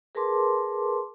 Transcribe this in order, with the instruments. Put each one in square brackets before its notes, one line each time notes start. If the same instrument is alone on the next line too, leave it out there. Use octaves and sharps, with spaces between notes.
[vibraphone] G#4 A#4 B4 A5 C6 D6